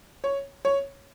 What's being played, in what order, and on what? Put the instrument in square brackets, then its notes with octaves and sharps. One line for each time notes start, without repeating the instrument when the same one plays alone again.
[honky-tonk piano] C#5
C#5